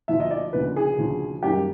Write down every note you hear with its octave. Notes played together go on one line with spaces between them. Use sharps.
D2 D3 F3 E5
D#5
D5
D2 C#3 F3 B4
G#4
D2 C#3 F3
F#2 D#3 G3 A#3 G4